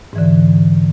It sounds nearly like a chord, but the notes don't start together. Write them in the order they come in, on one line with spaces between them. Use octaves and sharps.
G#2 E3 D3